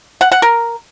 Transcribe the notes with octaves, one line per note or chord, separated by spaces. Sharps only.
F#5
F#5
A#4